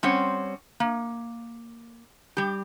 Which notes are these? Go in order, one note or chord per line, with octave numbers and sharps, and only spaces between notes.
G3 C4 C#4 C5 C#5 F#5
A#3
G3 G4